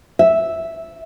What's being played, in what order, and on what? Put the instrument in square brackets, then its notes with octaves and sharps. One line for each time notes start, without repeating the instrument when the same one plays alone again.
[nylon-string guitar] E5